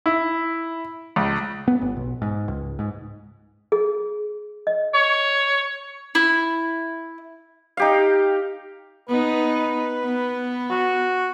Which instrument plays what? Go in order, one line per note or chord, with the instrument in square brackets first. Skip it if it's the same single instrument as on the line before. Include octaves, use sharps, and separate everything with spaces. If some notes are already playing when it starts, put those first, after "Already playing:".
[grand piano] E4
C#2
[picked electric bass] B3
G1
B1
G#2
C#2
G#2
[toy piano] G#4
D#5
[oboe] C#5
[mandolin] E4
[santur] D#4 G4 F5
[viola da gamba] B3 D#4 [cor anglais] B4
[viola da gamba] B3
[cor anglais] F#4